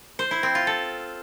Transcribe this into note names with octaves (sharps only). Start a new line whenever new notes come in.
C5
E4
C4
F4
A4